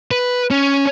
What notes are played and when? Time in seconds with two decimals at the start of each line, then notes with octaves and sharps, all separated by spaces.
0.11 B4
0.51 C#4